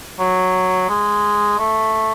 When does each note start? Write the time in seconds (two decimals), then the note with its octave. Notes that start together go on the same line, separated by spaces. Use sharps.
0.20 F#3
0.89 G#3
1.59 A3